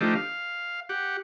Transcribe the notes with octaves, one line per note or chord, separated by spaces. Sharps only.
F3 A3 D4 D#4 G4
F5
G4 F#5